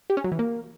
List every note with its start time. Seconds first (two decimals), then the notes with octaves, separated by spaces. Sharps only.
0.10 G4
0.17 C#4
0.24 F#3
0.32 E3
0.39 A#3